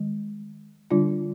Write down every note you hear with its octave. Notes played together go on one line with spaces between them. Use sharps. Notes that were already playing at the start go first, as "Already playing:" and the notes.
Already playing: D#3 G#3
D3 G3 D4 F4